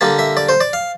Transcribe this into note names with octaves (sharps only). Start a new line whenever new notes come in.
D3 G3 A#3 A5
E5
D5
C5
D5
F5